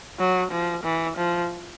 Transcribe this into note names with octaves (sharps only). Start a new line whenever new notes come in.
F#3
F3
E3
F3